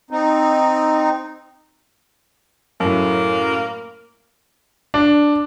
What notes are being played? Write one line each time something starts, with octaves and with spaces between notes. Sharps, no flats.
C4 D#4
F#2 A2 A#3
D4